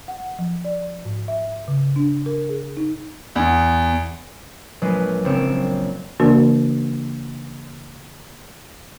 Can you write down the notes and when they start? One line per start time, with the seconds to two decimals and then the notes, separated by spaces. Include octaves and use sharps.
0.08 F#5
0.39 F3
0.65 D5
1.05 G#2
1.28 E5
1.68 C#3
1.96 D4
2.26 A#4
2.49 G#4
2.77 D#4
3.36 E2
4.81 A#1 F#3 G#3 B4 C7 D#7
5.25 F#1 C4 C#5 D7 E7
6.20 C#3 E3 A#3 D4 F#4 A#4